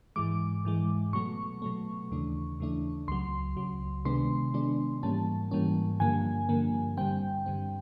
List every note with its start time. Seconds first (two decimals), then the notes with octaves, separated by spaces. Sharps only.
0.16 G#2 E3 G#3 D6
0.65 G#2 E3 G#3
1.13 B2 F#3 A3 C#6
1.62 B2 F#3 A3
2.11 D#2 C#3 E3 A3 D4
2.60 D#2 C#3 E3 A3 D4
3.08 C#2 C#3 F#3 C6
3.57 C#2 C#3 F#3
4.05 C3 D#3 G#3 B3 D4 C6
4.54 C3 D#3 G#3 B3 D4
5.03 G#2 E3 G3 A#3 C#4 A5
5.51 G#2 E3 G3 A#3 C#4
6.00 G2 D3 F3 A#3 G#5
6.49 G2 D3 F3 A#3
6.97 G2 D3 G3 C4 G5
7.46 G2 D3 G3 C4